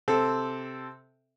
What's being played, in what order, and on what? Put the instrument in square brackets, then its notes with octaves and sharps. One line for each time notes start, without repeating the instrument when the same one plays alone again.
[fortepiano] C3 C4 A4